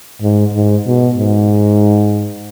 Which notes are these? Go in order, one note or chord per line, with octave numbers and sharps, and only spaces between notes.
G#2
G#2
B2
G#2